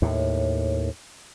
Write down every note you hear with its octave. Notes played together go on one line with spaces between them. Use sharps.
D#2 A2